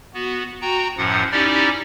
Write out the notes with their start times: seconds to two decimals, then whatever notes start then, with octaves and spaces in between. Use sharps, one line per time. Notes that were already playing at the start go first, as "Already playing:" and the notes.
0.14 B3 F#4
0.61 F#4 G5 A#5
0.97 F#2 A2 F3 F#5
1.32 C#4 D#4 E4 G4 D5